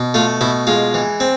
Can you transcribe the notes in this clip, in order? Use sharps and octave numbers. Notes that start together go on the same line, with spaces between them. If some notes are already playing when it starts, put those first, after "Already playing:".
Already playing: B2
A3 F4
B2 E4
G#3 F4
E3
C4